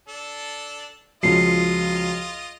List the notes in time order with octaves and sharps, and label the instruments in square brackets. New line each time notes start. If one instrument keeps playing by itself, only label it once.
[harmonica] D4 A4
[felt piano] C#2 F3 [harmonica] F4 D#5 [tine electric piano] F#4 C7